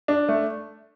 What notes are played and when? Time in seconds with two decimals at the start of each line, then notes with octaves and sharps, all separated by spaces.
0.08 D4
0.28 A3